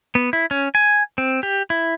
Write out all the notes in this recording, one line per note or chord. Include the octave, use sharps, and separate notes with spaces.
B3
E4
C#4
G#5
C4
G4
E4